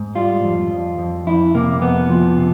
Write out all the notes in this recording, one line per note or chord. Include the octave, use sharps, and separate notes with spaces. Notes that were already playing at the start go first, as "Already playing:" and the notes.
Already playing: G#2
G3 F4
F2
F2
F2
F2 E4
C3 A#3
F2 B3
F3
C3